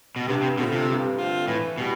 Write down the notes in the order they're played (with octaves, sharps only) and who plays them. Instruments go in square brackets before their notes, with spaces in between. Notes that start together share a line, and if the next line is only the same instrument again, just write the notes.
[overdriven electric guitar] B2
[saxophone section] G2 [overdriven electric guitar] C3
[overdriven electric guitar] C3
[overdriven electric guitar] B2 [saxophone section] D3 A3 C4 F4
[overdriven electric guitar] C3
[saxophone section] G2
D3 A3 C4 F4
[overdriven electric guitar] A2 [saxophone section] E3
[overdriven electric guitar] B2 [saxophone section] G3 B3 E4 G4